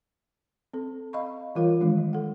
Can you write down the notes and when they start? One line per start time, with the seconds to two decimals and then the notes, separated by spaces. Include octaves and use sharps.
0.73 C4 A4
1.13 D#5 F5 B5 C#6
1.55 E3 G3 F4 A#4 C#5 F5
1.81 D#3 E3 G#3 D4
1.97 G3
2.13 A4 F#5